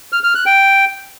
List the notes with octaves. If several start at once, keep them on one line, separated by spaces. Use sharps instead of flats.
F6
F6
F#6
G5